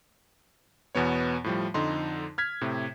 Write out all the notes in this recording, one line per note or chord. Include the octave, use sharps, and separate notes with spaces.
E2 B2 B3 C#5
A2 F3 G3
F2 D3 D#4 C6
F6 G#6 B6
A2 C3